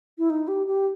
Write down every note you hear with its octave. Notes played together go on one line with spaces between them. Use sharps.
E4
D#4
G4
G4